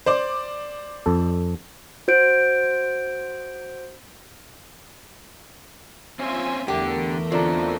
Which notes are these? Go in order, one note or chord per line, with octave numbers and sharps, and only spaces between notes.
C5 D5 D6
F2 A4
F#4 C5 G6 D7
C4 C#4 F4 E5 G#5
E2 D3 A3 G4 A#4
D3 C4 F4 A4 D5 A#5